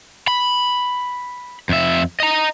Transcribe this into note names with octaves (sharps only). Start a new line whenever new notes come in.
B5
F2 E5
D#5 A#5